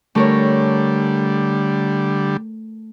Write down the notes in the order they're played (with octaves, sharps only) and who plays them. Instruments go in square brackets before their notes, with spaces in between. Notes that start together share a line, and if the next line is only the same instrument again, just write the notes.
[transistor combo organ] D3 G3 [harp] A3 A#4 C#5